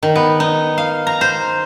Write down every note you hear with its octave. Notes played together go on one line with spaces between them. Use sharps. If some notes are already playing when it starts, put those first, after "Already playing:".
D#3
B3
D#4
F5
A#5
C5